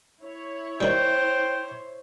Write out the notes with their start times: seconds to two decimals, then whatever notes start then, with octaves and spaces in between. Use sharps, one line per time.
0.21 E4 C#5
0.81 D#3 G3 C5 G5